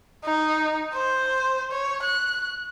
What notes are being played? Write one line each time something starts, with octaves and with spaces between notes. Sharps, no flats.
D#4
C5
C#5
F#6